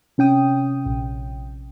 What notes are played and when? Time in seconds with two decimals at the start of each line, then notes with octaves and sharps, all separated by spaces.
0.18 C3 C#4 G5 D#6
0.86 A#1